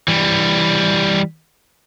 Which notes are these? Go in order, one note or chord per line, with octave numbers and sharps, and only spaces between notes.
E3 G3